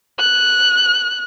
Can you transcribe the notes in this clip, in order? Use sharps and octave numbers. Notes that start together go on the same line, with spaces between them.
F#6